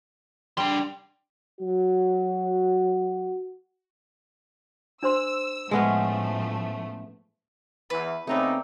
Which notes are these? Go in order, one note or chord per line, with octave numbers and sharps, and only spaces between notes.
G3 D4 C6
F#3 F#4
D4 C5 C6 E6
A2 F3 G#3 A3 B3 C#4
E2 E3 B4
C#3 A3 B3 C4 D#4 C#5 D5